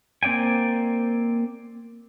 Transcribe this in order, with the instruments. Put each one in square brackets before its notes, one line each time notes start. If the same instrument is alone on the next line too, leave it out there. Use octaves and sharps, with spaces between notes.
[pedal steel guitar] A#3 C4 D5 G5 G#5